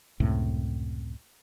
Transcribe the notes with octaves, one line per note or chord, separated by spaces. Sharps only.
C#2 F#2 A2 C3